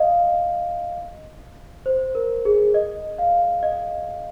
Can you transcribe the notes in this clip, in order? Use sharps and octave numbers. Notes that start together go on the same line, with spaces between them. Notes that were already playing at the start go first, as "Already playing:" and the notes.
Already playing: D#5 F5
C5
A#4
G#4
D#5
F5
D#5